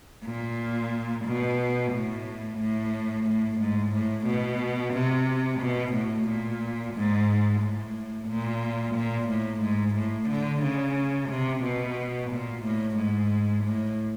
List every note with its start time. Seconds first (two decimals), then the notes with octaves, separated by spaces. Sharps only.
0.25 A#2
1.25 B2
1.92 A2
2.59 A2
3.26 A2
3.59 G#2
3.93 A2
4.27 B2
4.94 C3
5.60 B2
5.93 A2
6.28 A#2
6.94 G#2
7.61 A2
8.28 A#2
8.95 A#2
9.29 A2
9.62 G#2
9.95 A2
10.29 D3
10.62 C#3
11.29 C3
11.63 B2
12.31 A#2
12.64 A2
12.97 G#2
13.64 A2